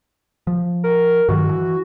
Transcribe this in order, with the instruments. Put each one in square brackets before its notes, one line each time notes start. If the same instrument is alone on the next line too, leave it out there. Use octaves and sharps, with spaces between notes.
[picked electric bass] F3
[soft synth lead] A#4
[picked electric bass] G2 D#3 F#3 [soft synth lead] F#4
[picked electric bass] E3